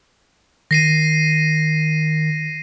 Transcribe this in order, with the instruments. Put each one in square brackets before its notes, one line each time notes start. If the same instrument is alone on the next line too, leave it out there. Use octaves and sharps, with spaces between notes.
[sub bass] D#3 [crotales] A#6 C7 D#7